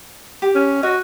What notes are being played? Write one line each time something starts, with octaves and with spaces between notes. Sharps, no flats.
G4
C#4
F#4 D#5